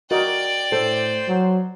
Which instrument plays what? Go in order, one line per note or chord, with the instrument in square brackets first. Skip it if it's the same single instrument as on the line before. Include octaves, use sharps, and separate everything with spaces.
[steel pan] F#4 A#4 D#5 [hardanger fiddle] D5 G5
[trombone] A2 [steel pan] A4 [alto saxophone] C5
[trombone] F#3